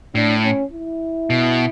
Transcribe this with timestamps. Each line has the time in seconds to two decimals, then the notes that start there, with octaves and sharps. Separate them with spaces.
0.15 A2 D4
0.44 C#4
0.72 E4
1.30 B2